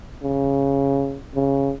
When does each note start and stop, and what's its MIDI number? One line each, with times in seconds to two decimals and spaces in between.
0.23 1.19 49
1.35 1.73 49